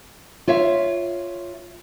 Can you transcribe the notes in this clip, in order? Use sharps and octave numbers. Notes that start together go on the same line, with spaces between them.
F4 C#5 E5 F5